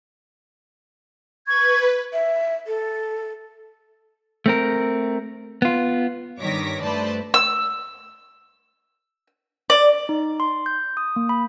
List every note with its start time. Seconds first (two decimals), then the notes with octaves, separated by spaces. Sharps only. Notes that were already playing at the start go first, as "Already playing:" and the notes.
1.47 B4 C#6 G#6
2.13 E5
2.67 A4
4.46 A3 C4 A#4
5.62 B3 F4
6.40 G2 D#3 C#5 D6 A#6 B6
6.83 G2 A3 B4 C5 D5 A5
7.34 E6
9.70 D5
10.09 D#4
10.40 C6
10.66 G6
10.97 D#6
11.16 A#3
11.29 B5